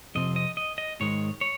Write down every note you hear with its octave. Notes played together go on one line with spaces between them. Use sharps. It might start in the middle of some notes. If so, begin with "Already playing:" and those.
F2 C3 F3 C4 D#5
D#5
D#5
D#5
G#2 D#3 G#3 C#5
C#5